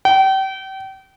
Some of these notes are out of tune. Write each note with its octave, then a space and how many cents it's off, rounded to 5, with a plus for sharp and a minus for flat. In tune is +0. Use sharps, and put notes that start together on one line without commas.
G5 -35